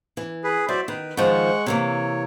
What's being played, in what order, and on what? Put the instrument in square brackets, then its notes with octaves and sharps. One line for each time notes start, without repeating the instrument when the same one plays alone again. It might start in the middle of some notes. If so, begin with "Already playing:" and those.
[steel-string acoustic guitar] E3
[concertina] G#4 B4
[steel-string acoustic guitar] F#3 [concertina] C5 D5 E5
[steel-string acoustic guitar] D#3 [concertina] B4
[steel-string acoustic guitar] D#3 F3 C5 [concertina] G#3 F#5 C#6
[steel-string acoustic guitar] C3 E3 A#3 [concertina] C#5